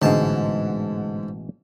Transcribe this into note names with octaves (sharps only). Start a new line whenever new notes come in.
A1 G#2 B2 D3 G#3 A5